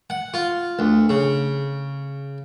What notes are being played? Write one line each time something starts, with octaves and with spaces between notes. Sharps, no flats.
F#5
F4
D2
C#3